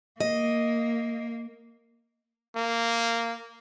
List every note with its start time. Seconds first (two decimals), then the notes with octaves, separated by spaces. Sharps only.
0.20 A#3 D#5
2.56 A#3